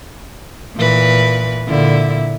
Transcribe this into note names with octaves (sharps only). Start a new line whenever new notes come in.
A#2 E3 B4
A#2 D3 E4